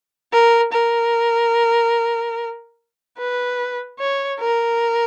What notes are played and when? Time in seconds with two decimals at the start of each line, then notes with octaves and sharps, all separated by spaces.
0.32 A#4
0.73 A#4
3.18 B4
3.99 C#5
4.40 A#4